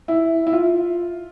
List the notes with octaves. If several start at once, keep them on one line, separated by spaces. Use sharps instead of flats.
E4
E4
F4